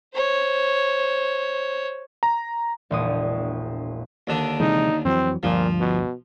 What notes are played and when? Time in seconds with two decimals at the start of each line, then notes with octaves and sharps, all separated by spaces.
0.14 C5 C#5
2.23 A#5
2.90 E1 A#1 D#6
4.27 D#2 D3 D4
4.60 C3 E3 G#3 D#4
5.05 F2 E3 F#3 C4
5.43 D2 G2 A#2 F3
5.80 B2